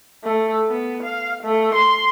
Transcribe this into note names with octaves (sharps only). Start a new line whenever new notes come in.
A3
B3
F5
A3
C6